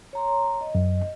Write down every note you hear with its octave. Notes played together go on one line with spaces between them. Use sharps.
C#5 A#5 C6
D#5
F#2